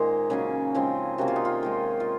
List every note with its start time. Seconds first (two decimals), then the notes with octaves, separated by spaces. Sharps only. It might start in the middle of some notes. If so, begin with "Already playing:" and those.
Already playing: A#2 D#3 G#3 A#3 D#4 A#4 C5
0.30 C#3 F#3 A#3 C#4 G#4
0.75 C#3 F3 G#3 C4
1.18 C3 D#3 A#3 C#4 F#4
1.28 F4
1.36 D#4
1.45 F4
1.63 D#3 G#3 D#4
2.00 F4